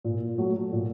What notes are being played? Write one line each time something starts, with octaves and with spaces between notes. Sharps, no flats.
A#2
F#3 A3
A#2